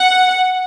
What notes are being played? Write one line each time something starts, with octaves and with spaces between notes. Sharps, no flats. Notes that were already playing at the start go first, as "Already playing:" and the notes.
Already playing: F#5